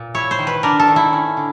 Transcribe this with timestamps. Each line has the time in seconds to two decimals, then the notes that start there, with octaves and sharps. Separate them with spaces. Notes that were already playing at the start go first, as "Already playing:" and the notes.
Already playing: A#2
0.14 E4 C#5
0.31 C5
0.39 D#3
0.47 B4
0.63 D4 A#4
0.79 A4
0.88 D#3
0.96 E4
1.13 C#4
1.37 D3